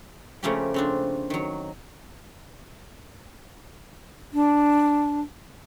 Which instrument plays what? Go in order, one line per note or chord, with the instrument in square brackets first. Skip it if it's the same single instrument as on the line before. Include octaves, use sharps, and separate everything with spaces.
[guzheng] C#3 F3 A3 A#3 C#4 G4
C#3 C4 D4
D#3 F#3
[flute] D4